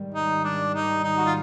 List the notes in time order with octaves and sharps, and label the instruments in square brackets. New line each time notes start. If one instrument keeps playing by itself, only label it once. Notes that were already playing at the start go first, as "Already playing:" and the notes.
Already playing: [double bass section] G#2 D#3 G3
[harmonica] D#4
D4
D#4
D#4
F#4
F4